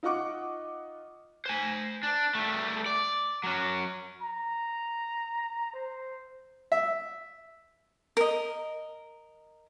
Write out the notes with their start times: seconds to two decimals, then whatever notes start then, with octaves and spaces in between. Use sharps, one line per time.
0.03 D#4 F4 D#5 F#5 C#6 D6
1.46 C5 G#5
2.03 D4
2.35 G3 A3
2.86 D5
3.44 F#3 C#4
4.22 A#5
5.74 C5
6.72 E5
8.17 A#4 D#5